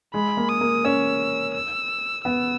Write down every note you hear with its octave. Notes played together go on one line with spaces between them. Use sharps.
G#3 B5
A#3
D#6
A#3
C#4 E6
E6
B3 E6